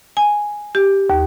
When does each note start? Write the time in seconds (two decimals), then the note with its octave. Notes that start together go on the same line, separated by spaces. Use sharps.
0.17 G#5
0.75 G4
1.10 D#2